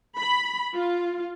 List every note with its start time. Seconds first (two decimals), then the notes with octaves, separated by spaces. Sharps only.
0.17 B5
0.75 F4